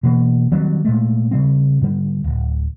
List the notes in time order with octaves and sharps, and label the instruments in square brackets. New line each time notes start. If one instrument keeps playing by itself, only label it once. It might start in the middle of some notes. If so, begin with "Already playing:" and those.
[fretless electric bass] B2 E3 A#3
D#3 F#3 G3 C4
A#2 G#3 A3
C#3 G3 C4
G#2 D3 G3
D1